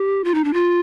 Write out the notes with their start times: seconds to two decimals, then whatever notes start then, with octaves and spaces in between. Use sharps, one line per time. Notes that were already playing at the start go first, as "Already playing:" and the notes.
Already playing: G4
0.24 F4
0.34 D#4
0.44 D4
0.53 F4